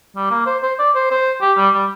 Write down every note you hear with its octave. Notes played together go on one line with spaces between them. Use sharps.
G3
A#3
C5
C5
D5
C5
C5
G4
G3
G3